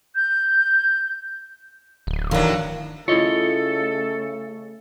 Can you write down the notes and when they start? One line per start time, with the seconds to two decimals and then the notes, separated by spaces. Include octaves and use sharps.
0.15 G6
2.07 D1
2.31 A2 D#3 E3 F#3 D4 F5
3.08 C#3 A3 E4 F4 A4 C#5 D#5